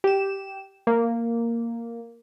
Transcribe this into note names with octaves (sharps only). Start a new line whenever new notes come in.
G4 E7
A#3